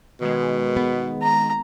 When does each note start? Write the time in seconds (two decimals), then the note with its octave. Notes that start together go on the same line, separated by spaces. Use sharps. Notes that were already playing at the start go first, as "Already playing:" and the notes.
0.21 B2 D#3 G#3
0.77 B3
1.23 A#5